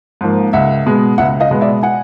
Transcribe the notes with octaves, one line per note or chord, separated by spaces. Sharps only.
G#2 F3 A#3
C#2 E5 F#5
B2 G#3 B3
C#2 E5 F#5
D#5 F5
B2 G#3 B3
D5 E5
F#5 G#5